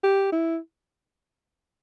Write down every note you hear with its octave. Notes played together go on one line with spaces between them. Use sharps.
G4
E4